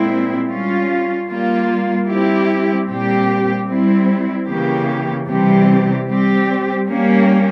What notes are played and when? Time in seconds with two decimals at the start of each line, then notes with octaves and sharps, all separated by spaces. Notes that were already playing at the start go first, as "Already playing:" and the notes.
Already playing: A#2 G#3 C4 E4
0.49 G3 C#4 F4
1.28 G3 A#3 F4
2.08 G3 C4 E4 G4
2.87 A#2 G3 C4 G4
3.67 G3 C4 E4
4.47 C#3 E3 A#3 C#4 G4
5.27 C3 E3 G3 C4 G4
6.06 G3 C4 G4
6.86 G3 A#3 C#4 G4